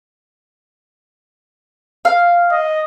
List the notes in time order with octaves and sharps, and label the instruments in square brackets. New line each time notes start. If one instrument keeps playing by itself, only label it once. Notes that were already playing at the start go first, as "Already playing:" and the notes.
[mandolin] F5
[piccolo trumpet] D#5